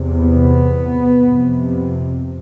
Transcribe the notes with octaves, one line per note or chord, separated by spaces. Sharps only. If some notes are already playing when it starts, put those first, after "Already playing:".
Already playing: E2 C3
B3
F2 C3